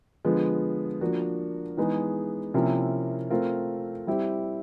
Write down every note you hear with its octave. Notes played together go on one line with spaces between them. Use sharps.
D3 F3 G#3 B3
F3 A#3 D4 F#4
E3 G#3 B3 D#4 G#4
C3 F3 A#3 C#4 E4
A3 C4 F4 A#4
G3 C4 E4 G4